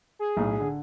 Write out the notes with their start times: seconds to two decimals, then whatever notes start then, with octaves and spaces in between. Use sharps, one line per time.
0.19 G#4
0.37 B1 A2
0.60 D3